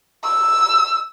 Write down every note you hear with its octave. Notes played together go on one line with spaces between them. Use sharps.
E6